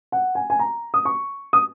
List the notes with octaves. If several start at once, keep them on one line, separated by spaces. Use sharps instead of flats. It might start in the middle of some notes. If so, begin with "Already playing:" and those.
F#5
G#5
G#5
A#5
D#6
C#6
D#6